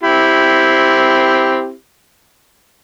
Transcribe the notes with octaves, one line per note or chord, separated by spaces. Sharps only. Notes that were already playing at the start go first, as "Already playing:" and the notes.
C4 E4 G4